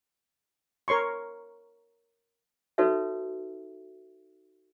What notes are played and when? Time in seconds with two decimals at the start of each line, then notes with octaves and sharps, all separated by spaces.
0.88 A#4 C#5 C6 C#6
2.78 D#4 F#4 A4 B4 C#5 E5